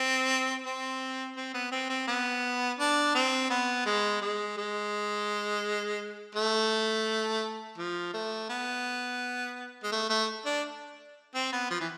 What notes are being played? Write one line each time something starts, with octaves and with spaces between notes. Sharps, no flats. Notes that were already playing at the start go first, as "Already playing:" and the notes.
Already playing: C4
C4
C4
B3
C4
C4
B3
D4
C4
B3
G#3
G#3
G#3
A3
F3
A3
B3
G#3
A3
A3
D4
C4
B3
F3
E3